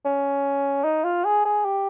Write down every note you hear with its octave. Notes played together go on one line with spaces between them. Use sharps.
C#4
D#4
F4
G#4
G#4
G4